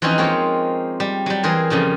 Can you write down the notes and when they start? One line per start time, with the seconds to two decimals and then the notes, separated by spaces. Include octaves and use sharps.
0.02 E3 F3 C4 C#4 D#4 F#4
0.18 G#3 A#3 C4 F4 C#5
1.00 G3
1.26 F#3 G3
1.43 E3 G#4 A#4 C5
1.70 F2 C#3 F3 G3